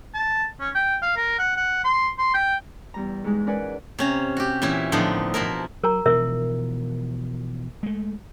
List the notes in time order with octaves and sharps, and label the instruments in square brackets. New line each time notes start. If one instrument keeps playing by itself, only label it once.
[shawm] A5
C#4
G5
F5
A#4
F#5
F#5
C6
C6
G5
[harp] E2 G3 A#5
G#2 G#3
C#4 A#4 B4 D5 F#5 G#5
[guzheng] C3 C#4 A#5
F#4 G4
A#2 E3 C#4 E4
A2 D3 F3 B3 D#4
B2 F3 E4 A#4
[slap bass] F#3 [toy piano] A#4 A#5
[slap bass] B2 E3 F3 [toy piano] A#4 E5
[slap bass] G#3 A3